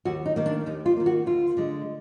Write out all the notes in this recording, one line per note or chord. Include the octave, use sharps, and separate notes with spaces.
D#2 F#4
D#4
D#3 A#3
D4
D#2 D#4
F4
D#3 A#3
F#4
D2 F4
D3 G#3